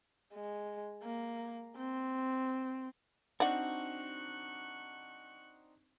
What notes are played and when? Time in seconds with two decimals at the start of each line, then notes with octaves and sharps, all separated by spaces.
0.33 G#3
1.03 A#3
1.77 C4
3.40 C4 D4 D#4 F#4 D5 F#5 C#6 F#6